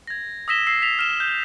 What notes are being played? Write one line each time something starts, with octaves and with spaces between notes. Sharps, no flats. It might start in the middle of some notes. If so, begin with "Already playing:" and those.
G#6 A#6
D#6 E6 A#6 B6 E7 G7
E6 C7
B6 F7
F6 E7
G6